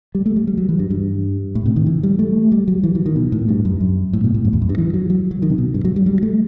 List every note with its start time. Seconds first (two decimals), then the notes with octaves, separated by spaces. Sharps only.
0.15 G3
0.26 A3
0.36 G3
0.47 G3
0.57 F#3
0.69 E3
0.79 G2
0.90 G2
1.55 A2
1.66 C3
1.76 D#3
1.86 E3
2.03 G3
2.19 A3
2.52 G3
2.68 F#3
2.83 E3
2.95 E3
3.06 D#3
3.16 B2
3.32 A2
3.49 G2
3.65 F#2
3.80 F#2
4.13 A2
4.24 B2
4.34 A2
4.45 F#2
4.53 E2
4.62 F#2
4.69 G2
4.78 E3
4.94 F#3
5.10 F#3
5.31 F#3
5.42 D#3
5.50 C3
5.58 B2
5.74 G2
5.85 F#3
5.96 G3
6.06 G3
6.23 A3